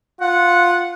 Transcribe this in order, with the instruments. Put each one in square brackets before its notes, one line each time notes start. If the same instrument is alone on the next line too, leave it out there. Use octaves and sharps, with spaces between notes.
[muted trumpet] F4 [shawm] F#5